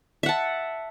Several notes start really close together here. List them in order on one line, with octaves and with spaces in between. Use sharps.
E5 F#5 A5